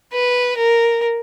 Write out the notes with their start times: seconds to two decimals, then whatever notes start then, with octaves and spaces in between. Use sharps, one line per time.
0.12 B4
0.57 A#4